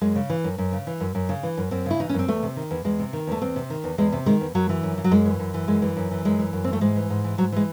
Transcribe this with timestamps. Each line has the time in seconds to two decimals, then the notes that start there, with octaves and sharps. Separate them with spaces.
0.01 F#2 G#3
0.16 C#3
0.30 E3
0.44 F#2
0.58 F#2
0.72 C#3
0.87 E3
1.00 F#2
1.15 F#2
1.29 C#3
1.43 E3
1.57 F#2
1.71 F#2 C4
1.86 C#3 E4
2.00 E3 D#4
2.09 C#4
2.14 F#2 C4
2.28 E2 A3
2.43 C3
2.56 D#3
2.71 E2
2.85 E2 G#3
2.99 C3
3.13 D#3
3.27 E2 A3
3.42 E2 C4
3.56 C3
3.70 D#3
3.84 E2
3.98 E2 G#3
4.12 C3
4.26 D#3 G#3
4.41 E2
4.55 F#2 F#3
4.69 E3
4.83 F#2
4.98 E3
5.04 F#3
5.11 F#2 G#3
5.26 E3
5.39 F#2
5.54 E3
5.68 F#2 G#3
5.82 E3
5.97 F#2
6.11 E3
6.25 F#2 G#3
6.39 E3
6.53 F#2
6.64 E3 C4
6.73 A3
6.81 G#2 G#3
6.96 E3
7.10 G#2
7.24 E3
7.38 G#2 F#3
7.52 E3 G#3